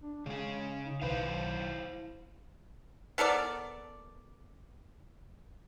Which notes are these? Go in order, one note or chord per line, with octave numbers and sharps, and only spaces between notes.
D4
C#3 G#3 G#4
D#4
B1 D#3 E4 B4 C5 F5
F#3
B3 A4 A#4 D5